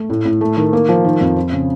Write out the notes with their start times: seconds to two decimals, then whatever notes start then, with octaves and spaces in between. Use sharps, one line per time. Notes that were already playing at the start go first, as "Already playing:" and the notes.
Already playing: A3
0.10 A2
0.25 A2
0.41 A3
0.57 D#3
0.73 A#3
0.89 F3
1.04 D#3
1.21 F2
1.36 C4
1.52 C#3